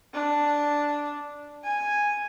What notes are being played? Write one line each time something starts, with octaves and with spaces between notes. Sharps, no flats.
D4
G#5